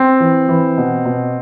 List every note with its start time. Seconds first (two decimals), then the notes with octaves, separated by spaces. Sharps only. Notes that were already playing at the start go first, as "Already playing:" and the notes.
Already playing: C4
0.20 E3
0.49 E3
0.78 B2
1.05 B2